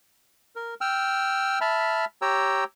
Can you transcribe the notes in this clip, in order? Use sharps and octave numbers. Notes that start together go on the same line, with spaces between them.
A#4
G5 E6 F6
E5 A5 B5 F6
G4 C#5 G5 A#5 E6